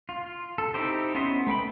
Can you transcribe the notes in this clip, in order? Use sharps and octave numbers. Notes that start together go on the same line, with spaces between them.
F4
A4
C4 D#4 E4 G4 C5
B3 C#4 D#5 E5 C6
A3 B4 G5 B5